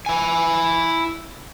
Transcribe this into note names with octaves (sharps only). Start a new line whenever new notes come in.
E4 G#5